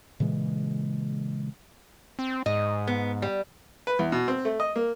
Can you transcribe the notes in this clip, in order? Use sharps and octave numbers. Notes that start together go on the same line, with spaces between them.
A#2 C#3 E3 G#3
C4
G#2 D#5
B3
G3
B4
E2
B2
C4
A3
D#5
A#3